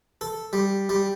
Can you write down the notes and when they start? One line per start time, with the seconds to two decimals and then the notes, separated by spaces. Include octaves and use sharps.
0.21 A4
0.53 G3
0.89 G3